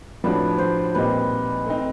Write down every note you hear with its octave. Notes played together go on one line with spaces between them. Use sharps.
A2 F3 A3 D4 F#4 B4
C5
A#2 G3 C4 D#4 B4
A3 C4 D#4